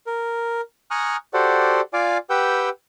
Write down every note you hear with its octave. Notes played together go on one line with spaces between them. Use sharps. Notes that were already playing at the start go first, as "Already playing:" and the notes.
A#4
G#5 A#5 C#6 D#6 F6 F#6
F#4 G4 A4 C5 D5 F#5
F4 D5 F5 G#5 D6
G4 B4 F#5 G5 E6 G6